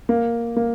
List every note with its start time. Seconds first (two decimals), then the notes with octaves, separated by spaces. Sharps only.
0.09 A#3
0.56 A#3